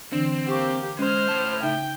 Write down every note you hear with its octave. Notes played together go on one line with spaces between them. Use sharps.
D3 E3 C4 D4
A#3 G4 C5 C#6
G#3 C#4 C5 F6
A2 A5
C#3 D#4 E5 G5